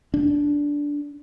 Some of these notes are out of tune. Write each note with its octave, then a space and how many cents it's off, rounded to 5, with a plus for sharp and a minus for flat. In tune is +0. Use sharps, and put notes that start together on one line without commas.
D4 -10